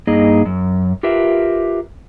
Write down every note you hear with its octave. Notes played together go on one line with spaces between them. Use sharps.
G2 A#3 D#4 G#4 D#5
F#2
F4 G4 A#4 B4 E5